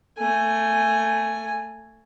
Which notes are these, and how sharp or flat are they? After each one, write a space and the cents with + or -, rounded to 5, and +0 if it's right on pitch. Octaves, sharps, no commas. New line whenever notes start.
A3 +20 G#5 +0